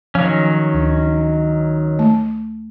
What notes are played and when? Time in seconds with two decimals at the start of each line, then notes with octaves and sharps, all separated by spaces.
0.15 D#3 F3 F#3 C#4
0.73 D2
1.99 A3